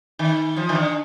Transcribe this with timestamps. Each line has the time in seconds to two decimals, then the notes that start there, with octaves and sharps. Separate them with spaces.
0.19 D#3
0.56 F3
0.69 D#3
0.75 D3